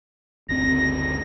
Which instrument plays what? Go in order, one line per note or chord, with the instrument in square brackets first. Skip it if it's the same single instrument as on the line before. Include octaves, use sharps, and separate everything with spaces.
[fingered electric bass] F#1 D2 C4 [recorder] A#6